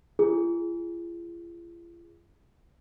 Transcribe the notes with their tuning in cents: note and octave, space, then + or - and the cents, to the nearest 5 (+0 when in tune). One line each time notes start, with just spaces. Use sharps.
F4 -45 G#4 -10